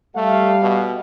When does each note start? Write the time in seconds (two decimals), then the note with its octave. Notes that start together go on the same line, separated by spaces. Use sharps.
0.16 G3 A3 F5
0.61 B2